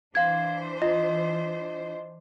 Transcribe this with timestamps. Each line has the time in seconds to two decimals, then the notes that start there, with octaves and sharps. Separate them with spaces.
0.15 E3 D4 C5 F5 G#6
0.82 F4 D#5